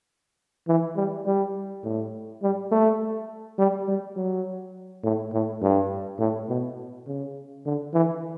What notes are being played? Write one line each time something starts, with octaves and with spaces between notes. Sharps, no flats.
E3
G3
G3
A2
G3
A3
G3
G3
F#3
A2
A2
G2
A2
B2
C#3
D3
E3